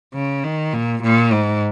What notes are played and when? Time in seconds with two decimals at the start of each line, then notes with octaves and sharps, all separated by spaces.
0.14 C#3
0.44 D#3
0.73 A#2
1.03 A#2
1.33 G#2